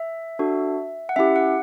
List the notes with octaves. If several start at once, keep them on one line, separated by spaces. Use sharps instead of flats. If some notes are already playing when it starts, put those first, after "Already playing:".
Already playing: E5
D4 F#4 A4
F#5
C#4 E4 G4 E5
F#5